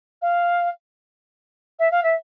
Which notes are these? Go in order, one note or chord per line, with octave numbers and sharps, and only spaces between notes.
F5
E5
F5
E5